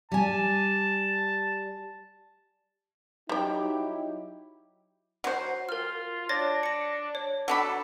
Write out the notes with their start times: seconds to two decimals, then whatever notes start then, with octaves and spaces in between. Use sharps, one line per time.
0.12 G3 G#5 A5
3.29 F#3 G3 D#4 E4 G4 G5
5.24 F#3 C5
5.69 F4 A#4 F6
6.29 D4 C#5 A6 A#6
6.63 A#6 C#7
7.15 C#5
7.48 F#3 D4 A4 B5